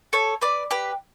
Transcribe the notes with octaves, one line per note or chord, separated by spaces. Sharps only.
A4 C#5
B4 D5
G4 B4